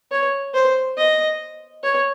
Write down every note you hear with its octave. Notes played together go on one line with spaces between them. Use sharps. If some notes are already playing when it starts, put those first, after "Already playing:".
C#5
C5
D#5
C#5